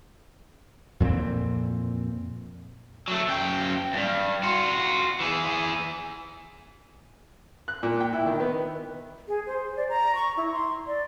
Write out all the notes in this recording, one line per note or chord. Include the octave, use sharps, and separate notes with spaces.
F2 A#2 E3 C4
F#3 A3
F#2 G5
E2 G2
F4 F#4
E3 G#4
F#6
A#2
G5
E4
D#3
B3
G#4
C5
D5
A#5
C#6
E4
C6
D5